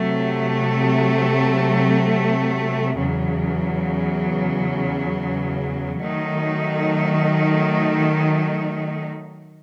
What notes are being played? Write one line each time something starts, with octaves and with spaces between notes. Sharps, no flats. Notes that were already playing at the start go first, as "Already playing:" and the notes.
Already playing: C3 F#3 A3
E2 C#3 F#3
D#3 F#3 A3 D#4